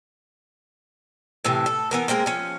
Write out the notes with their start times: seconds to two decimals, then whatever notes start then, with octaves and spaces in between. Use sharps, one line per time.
1.45 A2 C3 E3
1.66 A4
1.91 E3 B3 A#4
2.08 G#3 A#3 C4 A#4
2.26 F3 C#4